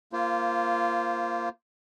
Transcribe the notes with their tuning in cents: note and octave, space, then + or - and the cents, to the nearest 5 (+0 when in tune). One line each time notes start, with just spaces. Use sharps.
A#3 +0 F4 -20 C5 +0